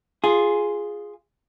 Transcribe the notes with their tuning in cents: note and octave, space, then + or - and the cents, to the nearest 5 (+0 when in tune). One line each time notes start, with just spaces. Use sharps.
F4 +0 G#4 +0